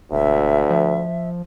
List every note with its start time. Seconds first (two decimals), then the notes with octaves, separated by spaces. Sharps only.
0.12 E1 D2 E5
0.70 F3